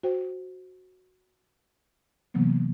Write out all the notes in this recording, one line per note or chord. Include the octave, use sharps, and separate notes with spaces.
F#4 C5 G5
C3 E3 F#3 A#3 B3